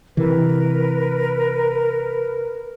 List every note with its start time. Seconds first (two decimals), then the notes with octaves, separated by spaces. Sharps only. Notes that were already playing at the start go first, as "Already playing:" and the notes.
0.17 C3 E3 A#4 B4